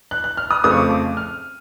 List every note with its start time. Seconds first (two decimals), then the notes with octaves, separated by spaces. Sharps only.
0.11 F#6
0.24 F#6
0.37 F6
0.51 D#6
0.64 F2 C#3 F3 A3 C4 D#6
0.72 C#6
0.77 D6
0.91 D6
1.17 F6